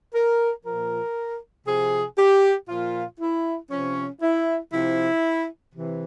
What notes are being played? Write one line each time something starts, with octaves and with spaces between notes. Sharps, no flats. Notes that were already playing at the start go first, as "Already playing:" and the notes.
A#4
A#2 F3 A#4
C3 F3 G#4
G4
A#2 F3 F4
E4
C3 F3 C#4
E4
C3 F3 E4
C3 E3